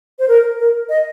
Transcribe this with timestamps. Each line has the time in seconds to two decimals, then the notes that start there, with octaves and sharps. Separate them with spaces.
0.19 C5
0.28 A#4
0.59 A#4
0.89 D#5